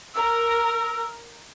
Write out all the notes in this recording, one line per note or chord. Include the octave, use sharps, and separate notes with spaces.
A#4 E6